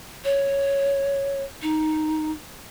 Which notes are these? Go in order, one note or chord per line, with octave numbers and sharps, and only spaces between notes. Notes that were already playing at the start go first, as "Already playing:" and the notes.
C#5
D#4